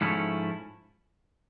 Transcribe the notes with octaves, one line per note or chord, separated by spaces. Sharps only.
G#2 F3 A3 C#4 E4